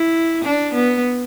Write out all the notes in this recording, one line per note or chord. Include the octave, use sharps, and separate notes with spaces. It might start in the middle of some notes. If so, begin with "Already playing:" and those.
Already playing: E4
D4
B3